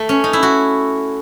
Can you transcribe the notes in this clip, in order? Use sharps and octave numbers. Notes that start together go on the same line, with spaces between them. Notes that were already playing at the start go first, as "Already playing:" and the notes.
Already playing: A3
C#4
D#4
E4
F#4